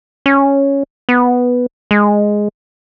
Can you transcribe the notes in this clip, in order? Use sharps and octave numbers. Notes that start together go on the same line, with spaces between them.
C#4
B3
G#3